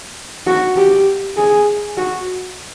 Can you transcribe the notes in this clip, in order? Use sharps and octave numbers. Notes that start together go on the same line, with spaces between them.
F#4
G4
G#4
F#4